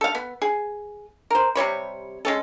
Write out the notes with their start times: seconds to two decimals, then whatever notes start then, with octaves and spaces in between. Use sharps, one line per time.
0.01 A4 F5
0.15 B3
0.42 G#4
1.30 A#4 C5
1.55 C3 G3 C#5 B5
2.25 G#3 C#4 A4